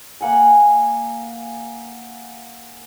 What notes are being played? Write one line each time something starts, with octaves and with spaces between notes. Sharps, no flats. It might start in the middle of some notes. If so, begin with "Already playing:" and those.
A#3 F#5 G#5